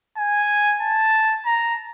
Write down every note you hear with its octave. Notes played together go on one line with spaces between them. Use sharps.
G#5
A5
A#5